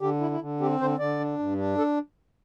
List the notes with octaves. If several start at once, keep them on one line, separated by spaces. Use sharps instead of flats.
D3 G4
E4
E4
D3
C4 G4
D3 C5
D3 D5
D4
G2
D4
A4